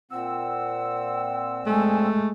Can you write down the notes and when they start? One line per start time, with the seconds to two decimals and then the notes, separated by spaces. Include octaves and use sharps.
0.11 A#2 C4 F#5 E6
1.66 G#3 A3 G#5